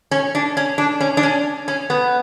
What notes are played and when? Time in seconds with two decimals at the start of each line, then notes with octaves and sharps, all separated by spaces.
0.11 C#4
0.35 D4
0.57 C#4
0.78 D4
1.00 C#4
1.17 D4
1.23 C#4
1.68 C#4
1.90 B3